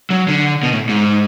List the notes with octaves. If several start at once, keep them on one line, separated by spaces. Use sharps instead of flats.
F#3
D3
B2
A2
G#2